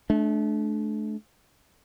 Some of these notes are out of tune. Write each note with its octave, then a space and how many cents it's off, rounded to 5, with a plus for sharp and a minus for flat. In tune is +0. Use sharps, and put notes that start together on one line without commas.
A3 -35 D4 +0